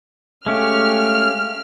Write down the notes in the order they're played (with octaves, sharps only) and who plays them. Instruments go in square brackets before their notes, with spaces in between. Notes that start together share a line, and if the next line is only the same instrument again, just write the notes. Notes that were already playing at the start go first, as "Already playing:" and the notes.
[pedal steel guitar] G#3 C#4 G4 [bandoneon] A3 [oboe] F5 [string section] F6